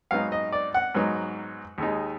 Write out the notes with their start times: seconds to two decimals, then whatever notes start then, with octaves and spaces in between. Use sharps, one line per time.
0.11 G#2 F#3 B3 D#4 F5
0.32 D#5
0.52 D5
0.74 F#5
0.95 G#2 F#3 B3 D#4
1.78 D#2 D#3 G#3 D#4